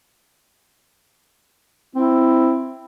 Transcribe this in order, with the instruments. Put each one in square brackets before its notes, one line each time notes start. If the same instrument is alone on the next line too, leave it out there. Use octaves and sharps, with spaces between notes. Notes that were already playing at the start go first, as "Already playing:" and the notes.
[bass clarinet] C4 [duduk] E4